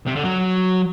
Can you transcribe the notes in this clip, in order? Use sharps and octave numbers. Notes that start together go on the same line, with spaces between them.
C3
D3
F#3